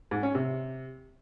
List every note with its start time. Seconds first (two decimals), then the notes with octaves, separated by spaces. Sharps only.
0.11 G#2
0.23 C#4
0.35 C3